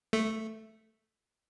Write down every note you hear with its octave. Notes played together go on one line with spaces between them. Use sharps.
A3